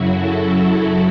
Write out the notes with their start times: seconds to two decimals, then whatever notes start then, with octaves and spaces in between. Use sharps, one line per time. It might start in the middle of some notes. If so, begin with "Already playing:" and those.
Already playing: F#2 C#3 F#3 E4 F#4
0.10 A4